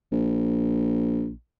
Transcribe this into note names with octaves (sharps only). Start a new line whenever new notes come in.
A#1